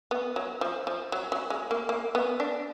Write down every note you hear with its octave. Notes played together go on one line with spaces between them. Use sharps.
B3
F#3
F3
F3
F#3
F#3
G#3
A#3
A#3
B3
D4